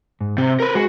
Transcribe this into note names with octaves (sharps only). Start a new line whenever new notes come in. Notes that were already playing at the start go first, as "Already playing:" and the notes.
G#2
C3 C4
A#4 B4
G#3 F#4 G#4